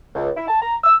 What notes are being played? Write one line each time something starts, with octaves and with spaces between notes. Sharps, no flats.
C#2
E4
A5
A#5
E6